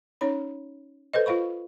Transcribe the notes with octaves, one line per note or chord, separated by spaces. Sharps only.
C#4 D#4 C#5 B5
A4 B4 C5 D#5
F4 C5 F5 B5 C#6